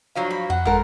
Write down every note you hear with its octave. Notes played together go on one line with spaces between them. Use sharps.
G2 F3 F#3 F5
B5
F2 F#5
G1 F3 G#3 A#4 F#5